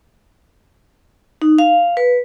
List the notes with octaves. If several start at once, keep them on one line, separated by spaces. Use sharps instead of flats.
D#4
F5
B4